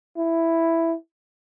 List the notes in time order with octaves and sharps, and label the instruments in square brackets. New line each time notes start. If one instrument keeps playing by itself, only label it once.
[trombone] E4